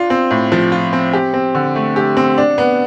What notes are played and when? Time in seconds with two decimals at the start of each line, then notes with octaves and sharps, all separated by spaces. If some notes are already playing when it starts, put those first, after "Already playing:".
Already playing: D4 F4
0.10 C4
0.31 A2
0.52 F3
0.72 F4
0.93 C4
1.13 G4
1.34 C4
1.55 D3
1.75 A3
1.96 G4
2.17 C4
2.38 D4
2.58 B3